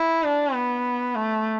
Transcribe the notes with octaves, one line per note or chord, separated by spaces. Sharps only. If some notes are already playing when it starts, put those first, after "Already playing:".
Already playing: E4
D4
B3
A3